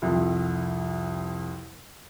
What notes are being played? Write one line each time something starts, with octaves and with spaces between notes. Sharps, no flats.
C2 F2